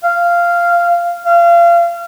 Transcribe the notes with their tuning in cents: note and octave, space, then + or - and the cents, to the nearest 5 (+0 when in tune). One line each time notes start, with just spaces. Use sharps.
F5 -10
F5 -30